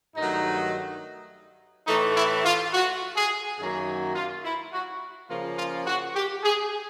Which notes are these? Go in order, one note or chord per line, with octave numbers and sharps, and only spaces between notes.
G2 D#3 F#3 A3 D#4
A2 E3 A3 D#4
E4
F4
F#4
G#4
F#2 D#3 F#3 A#3 G#4
F4
E4
F#4
C#3 F3 A#3 F4
F4
F#4
G4
G#4